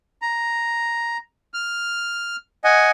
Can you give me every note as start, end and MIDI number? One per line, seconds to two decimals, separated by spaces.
0.22 1.17 82
1.54 2.36 89
2.64 2.91 75
2.64 2.91 78
2.64 2.91 80